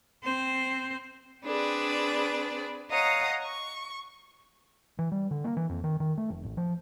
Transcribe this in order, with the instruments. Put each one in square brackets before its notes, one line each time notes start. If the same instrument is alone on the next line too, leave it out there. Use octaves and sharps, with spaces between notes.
[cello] C4 C5
[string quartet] C4 D4 G#4 B4 D5
C#5 D#5 F5 F#5 A#5 D#6
C#6
[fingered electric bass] E3
G3
D3
A#3
E3
F2
D#3
D#3
A3
F1
A1
F3